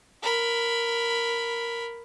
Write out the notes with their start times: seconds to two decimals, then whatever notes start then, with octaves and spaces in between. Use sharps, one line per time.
0.22 A#4 B5